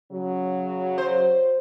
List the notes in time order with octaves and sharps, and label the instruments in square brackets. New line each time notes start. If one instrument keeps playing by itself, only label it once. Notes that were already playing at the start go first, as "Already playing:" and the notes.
[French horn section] C#3 F#3
[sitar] C5